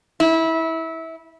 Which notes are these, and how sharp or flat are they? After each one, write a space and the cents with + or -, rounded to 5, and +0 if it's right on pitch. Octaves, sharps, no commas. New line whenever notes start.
E4 -20